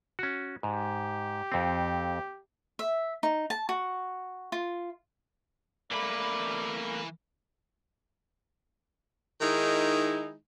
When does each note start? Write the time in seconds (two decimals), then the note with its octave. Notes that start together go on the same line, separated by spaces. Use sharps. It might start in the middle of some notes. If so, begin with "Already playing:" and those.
0.19 C#4 F#4
0.63 G#2 G4
1.52 F2 C4
2.79 E5
3.23 D#4
3.50 A5
3.69 F#4
4.52 F4
5.91 E3 A3 A#3 D5 B5
9.41 D#3 G#3 D#4 E4